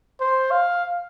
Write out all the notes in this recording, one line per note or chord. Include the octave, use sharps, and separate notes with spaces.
C5
F5